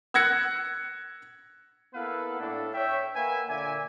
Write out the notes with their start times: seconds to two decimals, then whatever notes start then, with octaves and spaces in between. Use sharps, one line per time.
0.14 E6 F#6 G#6 A#6 C#7
1.94 A#3 B3 E4 A4 B4 F5
2.40 A2 D4 A4
2.74 C#5 E5 G5
3.15 A#3 B4 E5 F#5 G#5
3.48 A#2 D3 D5 E5 G#5